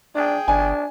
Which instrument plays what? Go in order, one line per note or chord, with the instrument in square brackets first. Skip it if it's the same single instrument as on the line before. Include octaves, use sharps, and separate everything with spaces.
[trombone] D4 [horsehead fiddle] G#4 G5
[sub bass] G1 [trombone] D4 [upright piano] G#5